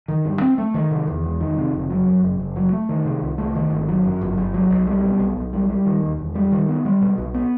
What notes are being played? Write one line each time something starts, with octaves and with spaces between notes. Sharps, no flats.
D#3
G2
C4
A3
D#3
C3
E2
E1
D#3
C3
F#1
F#3
F#2
F#1
F#1
F#3
A3
D#3
C3
C2
A3
D#3
G1
F#3
F#2
G1
G1
F#3
B1
G3
B2
B1
B1
G3
G3
D#3
D#2
E1
G3
D#3
B3
G3
B2
B1
B3